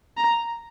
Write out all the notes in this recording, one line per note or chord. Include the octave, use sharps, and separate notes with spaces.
A#5